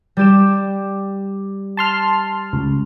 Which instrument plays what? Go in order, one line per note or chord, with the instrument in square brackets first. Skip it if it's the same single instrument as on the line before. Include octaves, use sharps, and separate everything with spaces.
[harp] G3 G4 E7
[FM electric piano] A5 C6 F6
C#2